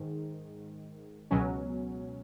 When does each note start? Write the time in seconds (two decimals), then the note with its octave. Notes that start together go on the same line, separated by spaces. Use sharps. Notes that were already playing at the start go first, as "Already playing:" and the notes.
Already playing: G#2 D#3
1.31 C#2 B2 F#3 C#4